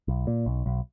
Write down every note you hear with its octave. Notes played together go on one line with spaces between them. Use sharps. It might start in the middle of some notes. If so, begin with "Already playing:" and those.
B1
A#2
B1
B1